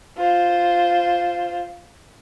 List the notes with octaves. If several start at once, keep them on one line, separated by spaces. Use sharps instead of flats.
F4 C5